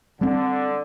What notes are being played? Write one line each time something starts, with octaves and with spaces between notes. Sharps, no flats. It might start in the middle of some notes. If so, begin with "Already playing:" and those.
D3 G3 C4